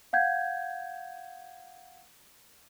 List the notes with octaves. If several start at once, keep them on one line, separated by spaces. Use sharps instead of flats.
F5 F#5 G6 G#6